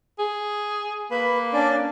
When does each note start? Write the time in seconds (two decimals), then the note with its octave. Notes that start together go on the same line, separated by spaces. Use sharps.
0.19 G#4
1.11 A#3 B4 B5
1.53 C#4 D4 D5